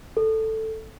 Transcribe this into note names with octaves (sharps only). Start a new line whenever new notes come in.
A4